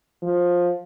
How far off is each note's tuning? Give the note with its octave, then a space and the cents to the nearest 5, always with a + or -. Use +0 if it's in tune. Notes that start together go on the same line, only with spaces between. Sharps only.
F3 +15